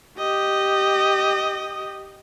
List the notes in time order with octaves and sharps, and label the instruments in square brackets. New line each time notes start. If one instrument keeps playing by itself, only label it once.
[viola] G4 D#5